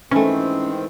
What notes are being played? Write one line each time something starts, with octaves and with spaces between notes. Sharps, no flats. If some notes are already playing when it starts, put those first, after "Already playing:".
G#2 D#3 E3 A3 C4 C#4